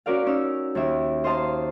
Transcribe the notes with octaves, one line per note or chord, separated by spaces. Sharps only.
C#4 F#4 A#4 D5 F5
C#4 D#4 E6
D#2 D#3 E5
C5 D#5 F5 A5 A#5 C6